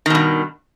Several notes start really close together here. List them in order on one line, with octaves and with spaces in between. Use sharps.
D#3 B2 G2